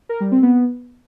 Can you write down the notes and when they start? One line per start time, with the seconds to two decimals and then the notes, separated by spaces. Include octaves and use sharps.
0.09 A#4
0.20 G3
0.32 C4
0.43 B3